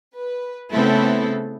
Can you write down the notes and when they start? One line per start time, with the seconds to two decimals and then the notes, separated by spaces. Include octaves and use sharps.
0.14 B4
0.72 C#3 A3 B3 C4 E4 A4